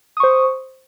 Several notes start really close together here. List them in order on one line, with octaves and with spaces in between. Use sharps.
D#6 C#6 C5